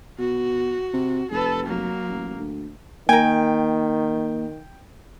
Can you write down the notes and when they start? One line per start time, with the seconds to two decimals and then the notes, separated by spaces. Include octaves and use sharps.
0.19 B2 F#4
0.94 C3
1.31 F1 A4 B4
1.66 F#3 A#3
2.10 A1
2.39 D2
3.09 D#3 A#3 A#4 G5 G#5